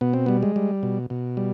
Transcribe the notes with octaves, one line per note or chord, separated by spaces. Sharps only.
B2 B3
C4
G3 B3
G#3
G3
B2
B2
G3